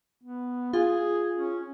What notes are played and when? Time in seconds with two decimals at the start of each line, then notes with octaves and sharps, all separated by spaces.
0.23 B3
0.73 F4 G#4
1.37 C#4